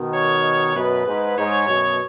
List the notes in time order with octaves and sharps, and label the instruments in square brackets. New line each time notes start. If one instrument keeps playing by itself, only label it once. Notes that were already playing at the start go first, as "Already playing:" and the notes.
Already playing: [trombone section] B2 D#3
[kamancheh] C#5
[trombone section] F#2 B2 [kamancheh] B4
[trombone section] G#2
[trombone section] G#2 [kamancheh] C#5
[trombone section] F#2 B2